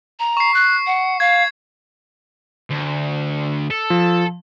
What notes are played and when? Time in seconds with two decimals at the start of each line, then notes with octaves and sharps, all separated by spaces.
0.20 A#5
0.37 C#6 C7
0.54 F#6
0.87 F#5
1.20 F5 G#6
2.71 D2
3.71 A4
3.90 F3